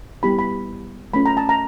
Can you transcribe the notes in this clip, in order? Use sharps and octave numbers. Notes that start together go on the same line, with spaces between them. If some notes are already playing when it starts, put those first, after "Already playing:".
G3 B3 E4 G4 B5
B5
A3 C#4 F4 B5
A#5
A5
A#5